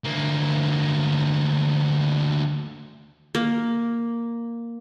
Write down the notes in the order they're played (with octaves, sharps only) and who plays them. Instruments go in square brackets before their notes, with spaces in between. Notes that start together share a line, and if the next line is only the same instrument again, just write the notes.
[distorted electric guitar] D2 A#3
[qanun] A#3